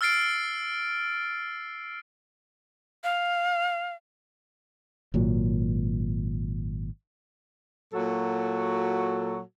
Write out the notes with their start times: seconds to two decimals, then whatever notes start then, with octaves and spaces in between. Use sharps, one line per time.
0.01 E6 F6 A6 C7 D7
3.04 F5
5.14 G#1 A#2 F#3
7.93 A#2 F#3 F#4 A4